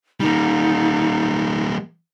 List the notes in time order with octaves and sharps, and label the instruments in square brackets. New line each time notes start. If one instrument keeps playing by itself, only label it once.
[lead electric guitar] G3 A#3 [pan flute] D#4